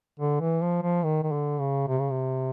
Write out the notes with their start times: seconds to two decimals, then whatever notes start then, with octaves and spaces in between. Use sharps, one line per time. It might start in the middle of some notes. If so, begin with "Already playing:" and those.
0.20 D3
0.40 E3
0.62 F3
0.82 F3
1.04 D#3
1.23 D#3
1.32 D3
1.60 C#3
1.88 C3
2.00 C#3
2.11 C3